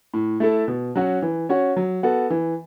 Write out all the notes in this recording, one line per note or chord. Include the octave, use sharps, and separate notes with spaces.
A2
A3 E4 A4
B2
F#3 C#4 F#4
E3
C#4 F#4 C#5
F#3
B3 F#4 A4
E3